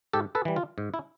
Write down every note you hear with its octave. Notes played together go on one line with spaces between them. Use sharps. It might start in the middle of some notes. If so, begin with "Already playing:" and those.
G#2 G4 A4
A4 B4
E3 G3
F4
G#2
E4